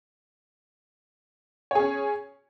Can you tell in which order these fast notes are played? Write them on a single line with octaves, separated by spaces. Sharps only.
C#5 G#4 C#4